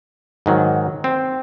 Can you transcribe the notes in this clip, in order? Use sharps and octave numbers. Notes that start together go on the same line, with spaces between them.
G#2 D#3 F#3
C4